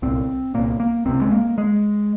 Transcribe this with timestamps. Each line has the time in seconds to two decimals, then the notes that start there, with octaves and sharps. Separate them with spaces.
0.02 C2 A#2 C4
0.54 C2 A#2 A#3
0.80 A#3
1.05 C#2 C3 C4
1.22 G#3
1.31 A#3
1.58 G#3